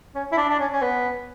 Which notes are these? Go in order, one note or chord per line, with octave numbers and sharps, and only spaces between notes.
C#4
E4
D4
D4
C#4
C#4
B3